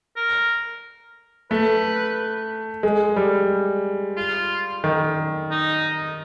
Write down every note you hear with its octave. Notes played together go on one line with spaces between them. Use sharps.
A#4
A3 B4
G#3
G3
F4
D#3
D#4